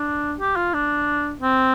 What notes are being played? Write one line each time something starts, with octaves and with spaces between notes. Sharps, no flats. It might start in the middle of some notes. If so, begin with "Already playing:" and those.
Already playing: D4
G4
F4
D4
C4